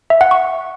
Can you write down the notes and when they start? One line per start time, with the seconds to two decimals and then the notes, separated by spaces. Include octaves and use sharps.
0.10 E5
0.21 F#5
0.31 C#6